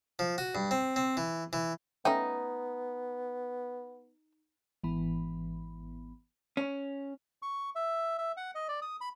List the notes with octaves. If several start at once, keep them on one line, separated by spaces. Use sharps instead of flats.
F3
F#4
G2
C4
C4
E3
E3
A3 B3 C#4 D#4 G5
G#1 E3 B3 B5
C#4
C#6
E5
E5
F#5
D#5
D5
D#6
B5